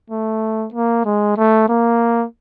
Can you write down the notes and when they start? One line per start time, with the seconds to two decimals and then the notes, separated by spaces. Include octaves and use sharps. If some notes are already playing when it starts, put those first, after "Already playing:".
0.10 A3
0.74 A#3
1.05 G#3
1.37 A3
1.69 A#3